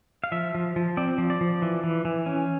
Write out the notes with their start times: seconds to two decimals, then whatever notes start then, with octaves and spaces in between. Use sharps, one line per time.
0.24 F5
0.32 F3 E5
0.55 F3
0.76 F3
0.97 C4 D5
1.18 F3
1.30 D5
1.41 F3
1.62 E3
1.84 E3
2.05 E3
2.26 C#4